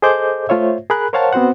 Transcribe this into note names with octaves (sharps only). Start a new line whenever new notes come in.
G#4 A4 C5 D#5 D6 G6
A3 F4 C5 C#5 E5
G#4 A#4 B5 F#6
A#4 C5 C#5 F5 F#5 A5
B3 C4 F#4 C5 F#5